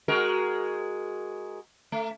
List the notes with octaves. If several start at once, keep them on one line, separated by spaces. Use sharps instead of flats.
G#3 F#4 A#4
A3